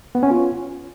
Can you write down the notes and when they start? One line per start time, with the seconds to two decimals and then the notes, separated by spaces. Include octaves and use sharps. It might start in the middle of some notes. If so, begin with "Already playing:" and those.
0.15 B3
0.23 C#4
0.31 F4